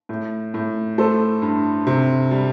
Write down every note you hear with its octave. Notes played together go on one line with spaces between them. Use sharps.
A2
A2
A3 A4 C5
G2
C3
G3